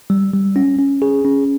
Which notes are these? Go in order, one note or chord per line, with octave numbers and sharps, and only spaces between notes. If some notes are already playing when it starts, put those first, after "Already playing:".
G3
G3
C#4
C#4
G#4
C#4